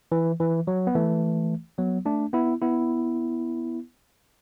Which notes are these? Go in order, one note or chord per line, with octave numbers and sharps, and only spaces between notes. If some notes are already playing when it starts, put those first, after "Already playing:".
E3
E3
F#3
B3
E3 A3
F#3 B3
A3 D4
B3 E4
B3 E4